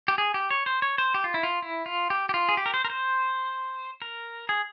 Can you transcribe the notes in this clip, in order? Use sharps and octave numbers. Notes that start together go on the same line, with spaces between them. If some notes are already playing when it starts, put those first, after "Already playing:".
G4
G#4
G4
C#5
C5
C#5
C5
G4
F4
E4
F4
E4
F4
G4
G4
F4
G#4
G4
A#4
C5
A#4
C5
A#4
G#4